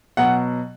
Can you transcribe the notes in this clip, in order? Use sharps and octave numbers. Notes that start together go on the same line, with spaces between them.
B2 F#3 F#5